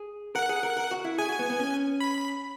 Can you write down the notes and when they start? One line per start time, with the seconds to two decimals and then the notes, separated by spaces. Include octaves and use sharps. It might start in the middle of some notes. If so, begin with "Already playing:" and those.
Already playing: G#4
0.35 A#4 F#5
0.49 G#4
0.63 A#4
0.77 A#4
0.91 F#4
1.04 E4
1.18 G#4 G#5
1.29 F#4
1.39 B3
1.50 B3
1.59 C#4
2.00 B5